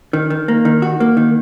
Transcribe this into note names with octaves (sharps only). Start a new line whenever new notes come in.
D#3
D#3
A#3
D#3
F#4
A#3
D#3